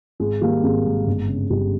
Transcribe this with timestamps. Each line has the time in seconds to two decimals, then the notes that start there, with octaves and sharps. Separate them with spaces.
0.20 G#1 G#3
0.41 D#3 G3 A#3
0.63 G#1 G#3
0.85 G#2
1.06 G1
1.28 C#3
1.50 G1 G3